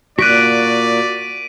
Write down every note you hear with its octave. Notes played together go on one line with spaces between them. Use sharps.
A#2 F#4 D5 F#6 B6 D7 D#7